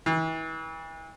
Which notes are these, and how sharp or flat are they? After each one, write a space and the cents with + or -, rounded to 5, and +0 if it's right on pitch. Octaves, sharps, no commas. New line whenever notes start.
E3 -35